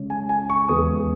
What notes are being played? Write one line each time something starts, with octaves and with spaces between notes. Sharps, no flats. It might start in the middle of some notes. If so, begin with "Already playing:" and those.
Already playing: C#3 G#3 C#4
G#5
G#5
C#6
E2 C#3 G#3 B3 D#6